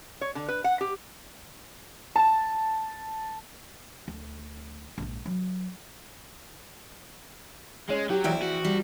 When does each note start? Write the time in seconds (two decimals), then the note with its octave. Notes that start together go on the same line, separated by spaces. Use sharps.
0.21 C#5
0.35 D3
0.48 B4
0.64 F#5
0.81 G4
2.16 A5
4.08 D2
4.98 A#1 G#2
5.26 F#3
7.90 G#3 C#4
8.10 F#3 G4
8.24 A#1 E3 E4 G5
8.42 F#4
8.65 G3